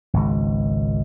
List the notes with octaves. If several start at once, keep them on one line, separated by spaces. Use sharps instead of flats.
G#1 C#2